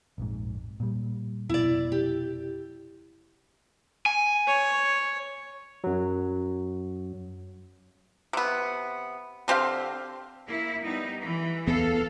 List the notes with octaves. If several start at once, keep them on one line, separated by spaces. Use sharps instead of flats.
A#1 F2 G#2
A#2 G3
F1 B2 E4 D5
G4
G#5
C#5
F#2 F#3
C3 B3
D3 C4 G4 F5
A#3 E4
G3 B3 D#4
E3
D1 E2 B3 A4 F5